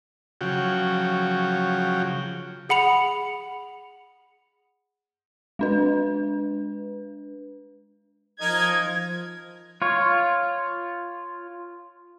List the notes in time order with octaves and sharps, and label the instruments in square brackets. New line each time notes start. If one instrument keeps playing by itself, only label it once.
[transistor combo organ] C#3 F3 F#3 F#4 G5
[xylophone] G#4 F#5 B5 C#7 F7
[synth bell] G#3 D4 B4
[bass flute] F3 [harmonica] D#4 A#4 D#5 [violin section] G#6
[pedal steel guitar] F4 C#5